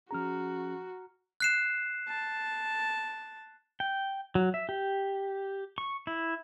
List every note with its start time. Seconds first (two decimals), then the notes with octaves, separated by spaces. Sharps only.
0.11 F3 C#4 F#4 G#4 A#5 F6
1.40 F#6 C7 E7
2.08 A5
3.80 G5
4.35 F#3
4.54 E5
4.69 G4
5.78 C#6
6.07 E4